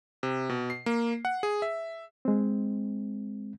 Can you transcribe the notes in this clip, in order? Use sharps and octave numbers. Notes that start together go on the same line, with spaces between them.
C3
B2
C7
A#3
F#5
G#4
E5
G#3 C4